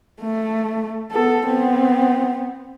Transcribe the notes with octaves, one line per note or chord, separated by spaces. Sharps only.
A3
B3 A4
B3 C4